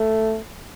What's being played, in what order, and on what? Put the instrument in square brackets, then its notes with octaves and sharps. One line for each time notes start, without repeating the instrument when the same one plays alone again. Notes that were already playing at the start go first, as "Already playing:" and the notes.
Already playing: [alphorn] A3